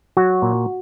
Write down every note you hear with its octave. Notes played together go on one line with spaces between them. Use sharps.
F#3 F#4
A#2